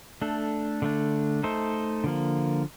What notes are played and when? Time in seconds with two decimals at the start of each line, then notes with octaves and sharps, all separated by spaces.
0.22 A3 D4 A4
0.82 D3 A3 D4
1.43 A3 D#4 A4 C5
2.04 D3 F3 A#3